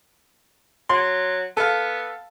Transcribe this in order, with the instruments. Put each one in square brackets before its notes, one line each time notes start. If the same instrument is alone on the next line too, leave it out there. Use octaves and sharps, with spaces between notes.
[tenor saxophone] F#3 [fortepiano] C6
[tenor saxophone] B3 [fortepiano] A4 F5